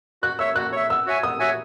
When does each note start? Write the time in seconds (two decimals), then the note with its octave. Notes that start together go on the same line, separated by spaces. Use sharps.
0.23 F#4 F#6
0.39 C#5 E5 E6
0.56 F#4 F#6
0.72 C#5 E5
0.90 B3 E6
1.06 F#4 C#5 E5 G#5
1.23 B3 D#6
1.39 F#4 C#5 E5 G#5